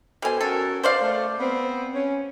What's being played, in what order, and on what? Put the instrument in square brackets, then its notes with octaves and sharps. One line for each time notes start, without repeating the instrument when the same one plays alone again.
[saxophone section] B2 A4 C5 [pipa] G3 G#5
[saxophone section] C#4 F#4 A#4 [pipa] A4
[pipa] C5 D5 F5
[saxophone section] A3
B3 C4
C#4